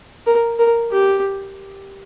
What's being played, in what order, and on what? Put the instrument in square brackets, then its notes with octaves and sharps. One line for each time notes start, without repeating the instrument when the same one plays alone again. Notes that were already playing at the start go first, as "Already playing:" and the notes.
[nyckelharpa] A#4
A#4
G4